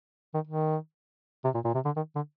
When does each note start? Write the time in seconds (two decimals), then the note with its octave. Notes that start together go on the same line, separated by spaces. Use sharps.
0.34 D#3
0.47 D#3
1.44 C3
1.54 A#2
1.65 A#2
1.74 C3
1.85 D3
1.96 D#3
2.16 D3